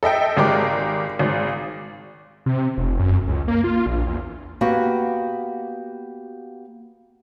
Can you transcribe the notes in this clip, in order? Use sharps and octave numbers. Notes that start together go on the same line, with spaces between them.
A4 D#5 E5 G5
G#1 G#3 G4 A#4 D6
G#1 G#3
C3
F1
F#2
C#2
A#3
F4
A#1
E2
A#3 B3 F#4 G4